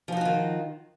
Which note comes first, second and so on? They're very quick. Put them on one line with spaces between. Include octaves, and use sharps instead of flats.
F3 D#4 F#4 F4 D#3